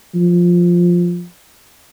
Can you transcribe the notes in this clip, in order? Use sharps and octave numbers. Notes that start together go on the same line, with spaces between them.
F3